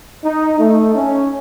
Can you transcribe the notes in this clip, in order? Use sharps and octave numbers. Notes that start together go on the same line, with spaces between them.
D#4
A3
C#4